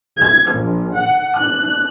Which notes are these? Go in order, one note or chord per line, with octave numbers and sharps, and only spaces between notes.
G#6
A#1
F#5
F#6